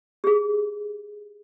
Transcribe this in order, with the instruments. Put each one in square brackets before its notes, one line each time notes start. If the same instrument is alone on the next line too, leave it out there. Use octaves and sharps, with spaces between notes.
[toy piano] G4 G#4